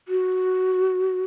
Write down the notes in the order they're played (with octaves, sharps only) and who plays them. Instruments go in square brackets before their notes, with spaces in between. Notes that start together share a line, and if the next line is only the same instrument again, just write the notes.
[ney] F#4